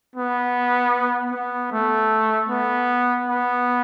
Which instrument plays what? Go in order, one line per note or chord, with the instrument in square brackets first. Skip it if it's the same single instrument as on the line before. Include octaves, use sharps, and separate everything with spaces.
[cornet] B3
B3
A3
B3
B3